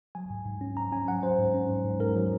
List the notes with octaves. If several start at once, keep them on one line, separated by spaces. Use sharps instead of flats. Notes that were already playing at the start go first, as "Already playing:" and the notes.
F#3 G#5
G#2
G#2
C#4
G#2 A#5
C#4 G#5
F#3 F#5
F#3 C5
G#2
C#4
G#2
G#2
G#2 A#4
F#3